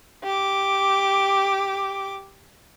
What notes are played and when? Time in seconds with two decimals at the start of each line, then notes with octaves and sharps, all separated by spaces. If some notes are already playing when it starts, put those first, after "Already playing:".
0.23 G4 D6